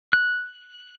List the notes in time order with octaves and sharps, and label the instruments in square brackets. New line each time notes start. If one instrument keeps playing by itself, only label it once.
[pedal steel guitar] F#6